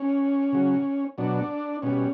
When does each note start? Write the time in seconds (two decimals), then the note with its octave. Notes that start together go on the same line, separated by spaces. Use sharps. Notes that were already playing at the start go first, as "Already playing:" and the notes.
Already playing: C#4
0.53 C#3 F#3
1.18 B2 F#3 D4
1.82 B2 G3 C#4